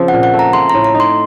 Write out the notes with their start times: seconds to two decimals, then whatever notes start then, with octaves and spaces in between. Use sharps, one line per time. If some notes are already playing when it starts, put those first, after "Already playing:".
Already playing: C#3 F3 C4
0.08 F#5
0.14 A#2
0.23 F#5
0.33 A3
0.39 A#5
0.53 A3 C6
0.70 A#5
0.74 A2
0.84 A#5
0.94 D#4
1.00 C6